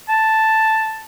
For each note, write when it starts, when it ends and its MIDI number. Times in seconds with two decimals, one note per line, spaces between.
0.09 1.06 81